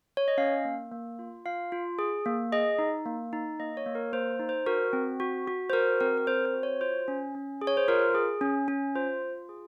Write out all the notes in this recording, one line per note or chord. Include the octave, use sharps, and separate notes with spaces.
C#5
D#5
C#4 F5
A#3
A#3
F4
F4 F5
F4
G#4
A#3
G#4 D#5
D#4
A#3
D#4
A#3 D#5
C#5
A#3
A#4
A#3 C5
D#4
C5
F#4 A#4
C4
F#4
F#4
C5
F#4 A#4
C4 A#4
A#4
C4 C5
C5
F#4
C#5
F4 C5
C#4
C#4
G#4
C#5
C5
F4 A#4
G#4
C#4
C#4
F4 C5
F4
G#4